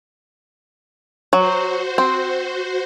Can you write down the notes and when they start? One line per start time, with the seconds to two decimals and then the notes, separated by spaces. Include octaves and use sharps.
1.33 F#3 F#4 C5
1.98 C4